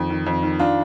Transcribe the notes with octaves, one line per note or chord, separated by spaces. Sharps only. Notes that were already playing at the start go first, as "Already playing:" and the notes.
Already playing: F2 D#3
D#3
F2
D#3
D4 F4